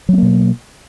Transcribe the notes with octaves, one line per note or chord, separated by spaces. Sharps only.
B2 F#3 A#3 B3